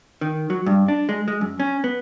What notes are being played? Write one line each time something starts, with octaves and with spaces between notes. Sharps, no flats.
D#3
F#3
G2
D4
G#3
G#3
F#2
C#4
B3